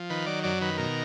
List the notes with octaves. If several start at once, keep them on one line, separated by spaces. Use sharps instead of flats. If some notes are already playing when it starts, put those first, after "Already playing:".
Already playing: F3
D#3 B4
F#3 D5
F#2 D5
D#3 B4
B2 A#4